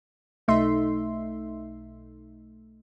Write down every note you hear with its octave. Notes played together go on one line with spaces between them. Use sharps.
B1 A3 D#4 E5 C6